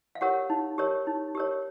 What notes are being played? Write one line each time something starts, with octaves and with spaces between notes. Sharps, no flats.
F5
G4 A#4 C#5 F#5
D#4
G4 A#4 C#5
D#4
G4 A#4 C#5